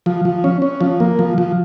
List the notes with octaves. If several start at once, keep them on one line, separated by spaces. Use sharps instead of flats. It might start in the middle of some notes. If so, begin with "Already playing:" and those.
F3
F3
C#4
C#4
F3
A#3
F3
F3